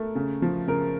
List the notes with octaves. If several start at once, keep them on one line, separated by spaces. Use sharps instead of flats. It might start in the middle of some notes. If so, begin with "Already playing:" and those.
Already playing: A3 A#4
C#3
F3
C#3 A#4